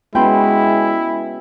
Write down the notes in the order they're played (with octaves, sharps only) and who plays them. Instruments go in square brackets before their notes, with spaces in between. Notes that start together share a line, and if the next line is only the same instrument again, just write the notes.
[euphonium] G#3 [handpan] B3 C#4 F#4 [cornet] E4 [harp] G5 B5 C6